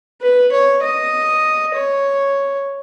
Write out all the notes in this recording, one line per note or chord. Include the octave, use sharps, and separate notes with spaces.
B4
C#5
D#5
C#5